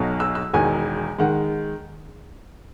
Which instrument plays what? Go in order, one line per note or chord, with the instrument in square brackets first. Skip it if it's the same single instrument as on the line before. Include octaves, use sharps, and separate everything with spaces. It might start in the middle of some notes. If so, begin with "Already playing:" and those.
Already playing: [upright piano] B1 B2 F#3
E6
E6
E1 E2 D#3 G#5
D#3 G#3 F#5